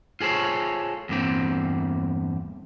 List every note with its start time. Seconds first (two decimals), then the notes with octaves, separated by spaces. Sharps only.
0.21 F4 G#4 A4 C5 C#5
1.09 E2 G2 A#3 C4